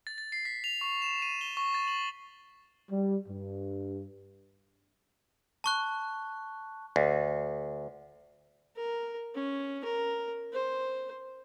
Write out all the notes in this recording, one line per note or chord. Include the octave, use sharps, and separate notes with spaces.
A6
A6
C7
B6
F7
C#6
E7
D#7
G7
C#6
A6
F#7
G3
G2
A5 C#6 F#6
D2
A#4
C#4
A#4
C5